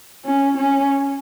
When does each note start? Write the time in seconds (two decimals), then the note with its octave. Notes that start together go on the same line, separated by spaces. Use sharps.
0.25 C#4
0.57 C#4